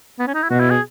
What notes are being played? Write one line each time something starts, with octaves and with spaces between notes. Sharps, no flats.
B3
C#4
D#4
E4
B2 F#4
E4
G#4